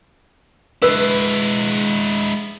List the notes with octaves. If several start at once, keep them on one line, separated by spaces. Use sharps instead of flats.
G#3 E4 B4 E6